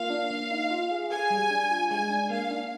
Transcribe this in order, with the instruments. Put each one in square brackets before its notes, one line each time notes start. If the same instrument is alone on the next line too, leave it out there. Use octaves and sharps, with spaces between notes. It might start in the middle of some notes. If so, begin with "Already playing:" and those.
Already playing: [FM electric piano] A#3 F4 [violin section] F5
[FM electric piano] D4
A#3
D#4
F4
G#4
[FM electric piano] G#4 [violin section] G#5
[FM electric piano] G3
D4
F4
[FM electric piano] G#3 [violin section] G#5
[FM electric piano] D4
[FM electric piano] A#3 [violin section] F5
[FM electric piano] D4